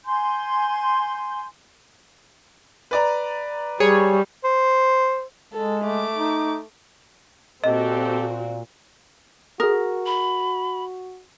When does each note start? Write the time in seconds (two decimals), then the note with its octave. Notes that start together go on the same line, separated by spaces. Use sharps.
0.05 G#5 C6 G6
2.91 B4 D5 A#5
3.80 G3 G#4 C#5
4.44 C5
5.53 G#3 A4
5.85 A3 D6
6.16 D#4
7.64 A#2 C4 F#4 G4 A4 D#5
9.60 F#4 G#4 A#4 D#6
10.06 B5